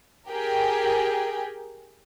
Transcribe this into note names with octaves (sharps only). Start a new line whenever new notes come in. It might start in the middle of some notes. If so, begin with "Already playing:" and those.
G4 G#4 A#4 G5